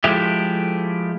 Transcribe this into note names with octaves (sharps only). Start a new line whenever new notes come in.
F3 G#3 A3 E4 G4